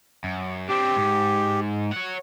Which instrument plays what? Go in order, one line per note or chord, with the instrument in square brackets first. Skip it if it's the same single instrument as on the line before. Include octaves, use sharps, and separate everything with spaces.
[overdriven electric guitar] F#2
[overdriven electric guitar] C4 D4 [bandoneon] G4
[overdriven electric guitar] G#2
C#5 F#5